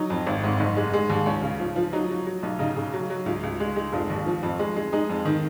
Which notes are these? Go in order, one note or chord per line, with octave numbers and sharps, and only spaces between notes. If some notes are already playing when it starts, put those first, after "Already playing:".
Already playing: F#3 D#4
F2
G#1
G#2
F#1
G#3
G#3
D#2
C#2 C#4
C#3
F3
F3
F#3 D#4
F#3
F#3
B1
C#3 D#4
C#3
F#3
F#3
C#2 F4
C#2
G#3
G#3
F1 F4
D#2
F3
F2
G#3
G#3
G#3 D#4
F2
D#3